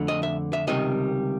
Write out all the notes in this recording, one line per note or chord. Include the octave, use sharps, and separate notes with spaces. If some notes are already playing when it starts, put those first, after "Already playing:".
Already playing: F2 D3 A3
D#5
E5
E5
C#2 C3 D#3 G3 D#5